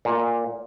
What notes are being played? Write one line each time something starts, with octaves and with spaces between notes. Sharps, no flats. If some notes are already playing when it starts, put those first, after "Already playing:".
A#2